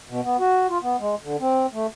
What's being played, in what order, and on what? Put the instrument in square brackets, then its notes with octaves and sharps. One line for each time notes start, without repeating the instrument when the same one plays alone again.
[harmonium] B2
B3
F#4
F4
B3
G#3
D3
C4
A3